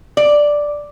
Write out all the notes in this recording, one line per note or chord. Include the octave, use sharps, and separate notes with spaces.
D5